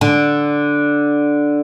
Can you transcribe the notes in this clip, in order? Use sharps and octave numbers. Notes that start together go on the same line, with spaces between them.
D3